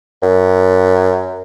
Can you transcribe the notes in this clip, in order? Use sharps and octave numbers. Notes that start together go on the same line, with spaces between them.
F#2